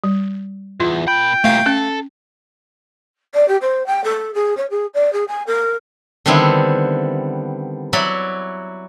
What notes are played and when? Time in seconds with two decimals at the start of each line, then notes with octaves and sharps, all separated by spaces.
0.04 G3
0.80 E2 F4
1.08 A#2 G5 B5
1.44 C2 A#2 A3 F5
1.66 C#4 A4
3.34 D5
3.48 G4
3.61 C5
3.86 G5
4.04 A4
4.34 G#4
4.57 C#5
4.70 G#4
4.94 D5
5.13 G#4
5.28 G#5
5.46 A#4
6.26 D3 D#3 G3 B3 C4 E4
7.93 F#3 E4 F#4 D5 B5